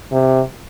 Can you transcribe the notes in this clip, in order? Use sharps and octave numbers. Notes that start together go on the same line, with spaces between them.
C3